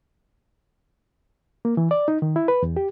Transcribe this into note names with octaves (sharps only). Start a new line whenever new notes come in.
A#3
E3
D5
D#4
D#3
E4
B4
E2
G4